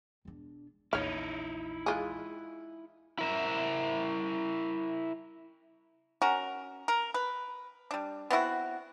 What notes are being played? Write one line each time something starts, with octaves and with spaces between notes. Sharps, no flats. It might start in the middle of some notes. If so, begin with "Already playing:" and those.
E1 D4
A#1 E2 D#4 E4 C#5 F5
G#3 F4 G#4
E4 A#4 E5
C#4 F#4 A#4
A#4
B4
G3 D4
B3 C4 E4 F#4